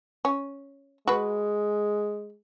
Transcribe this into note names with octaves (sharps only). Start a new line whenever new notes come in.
C#4
G#3 F#4 B4